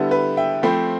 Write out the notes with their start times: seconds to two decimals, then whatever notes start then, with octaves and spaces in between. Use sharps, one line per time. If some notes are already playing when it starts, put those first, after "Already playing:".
Already playing: D3 G3 B3 E4 A4
0.11 B4
0.37 E5 G5
0.63 F3 A3 C4 G5 B5